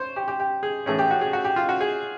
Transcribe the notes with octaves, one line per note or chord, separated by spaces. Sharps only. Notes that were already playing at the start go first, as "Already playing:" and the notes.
Already playing: C5 C#5
G4
G4
G4
G#4
A2 E3 A3 C#4 G#4
G4
F#4
G#4
F#4
G4
F4
F#4
G#4